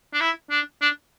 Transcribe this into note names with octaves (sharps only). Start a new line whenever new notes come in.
D4
E4
D4
D4